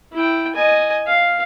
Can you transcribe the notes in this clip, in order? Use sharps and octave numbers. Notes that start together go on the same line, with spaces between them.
E4 G5
D#5 G#5
F5